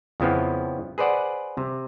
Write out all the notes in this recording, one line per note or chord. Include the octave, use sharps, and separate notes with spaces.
F2 C#3 F3 B3 E4
G#4 B4 C5 D5 F#5
C3